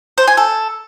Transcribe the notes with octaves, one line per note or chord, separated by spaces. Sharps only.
C5
G#5
A4